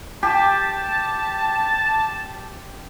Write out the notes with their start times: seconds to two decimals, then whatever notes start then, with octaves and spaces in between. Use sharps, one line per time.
0.23 G4 A5